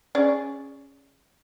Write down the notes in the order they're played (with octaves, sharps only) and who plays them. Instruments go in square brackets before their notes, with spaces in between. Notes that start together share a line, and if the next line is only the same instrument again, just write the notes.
[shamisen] C#4 G#4 D5